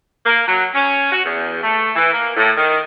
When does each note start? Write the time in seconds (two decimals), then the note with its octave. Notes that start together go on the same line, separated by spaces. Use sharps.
0.25 A#3
0.47 F#3
0.73 C#4
1.12 F#4
1.25 E2
1.63 A3
1.96 E3
2.13 A#3
2.36 A2
2.57 D#3